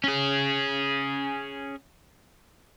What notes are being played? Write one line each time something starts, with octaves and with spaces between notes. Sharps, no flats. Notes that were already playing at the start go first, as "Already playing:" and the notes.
C#4 G#4